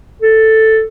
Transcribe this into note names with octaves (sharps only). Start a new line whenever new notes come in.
A4